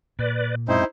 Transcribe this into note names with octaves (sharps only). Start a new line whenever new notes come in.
A#2 B4 D5
F#2 G#3 C4 D#4 E4 C5